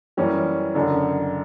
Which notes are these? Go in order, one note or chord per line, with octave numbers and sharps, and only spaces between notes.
F#2 E3 G3 C#4
F#1 F#2 D3